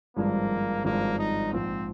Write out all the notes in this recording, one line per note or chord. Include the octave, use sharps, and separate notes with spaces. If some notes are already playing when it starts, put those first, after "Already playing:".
G#1 G2 F3 G#3 A#3 D4
G#1 G2 F3 G#3 A#3 D4
D#4
A#1 G#2 F3 C4